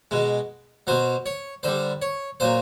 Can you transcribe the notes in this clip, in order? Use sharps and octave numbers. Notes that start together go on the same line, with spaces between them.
B2 G#3
B2 F#3 C5
C#5
D3 G3 C5
C#5
A#2 F#3 C5